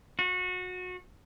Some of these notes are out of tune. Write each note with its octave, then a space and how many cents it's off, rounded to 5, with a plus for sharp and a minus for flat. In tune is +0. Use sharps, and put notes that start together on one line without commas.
F#4 -25